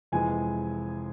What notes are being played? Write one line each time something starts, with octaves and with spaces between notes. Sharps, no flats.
F1 F2 E3 G#3 G#5